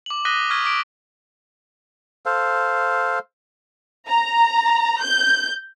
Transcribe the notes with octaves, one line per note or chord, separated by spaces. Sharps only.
D6 F#7
D#6 F#6 A#6 B6 D#7 G7
C#6 D#6 F6 G#6 B6
D6 B6 D7
A4 C5 F5
A#5
G6